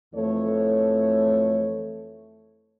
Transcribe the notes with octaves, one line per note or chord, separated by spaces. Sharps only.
F2 E3 A3 A4 C#5